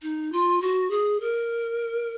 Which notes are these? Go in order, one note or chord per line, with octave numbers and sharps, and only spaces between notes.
D#4
F4
F#4
G#4
A#4